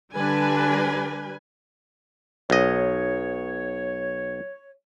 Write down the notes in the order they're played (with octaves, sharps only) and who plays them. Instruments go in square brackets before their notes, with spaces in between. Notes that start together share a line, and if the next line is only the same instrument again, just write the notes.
[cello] D3 D4 [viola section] G3 B4 G#5
[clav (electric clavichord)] B1 D#5 [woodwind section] C#5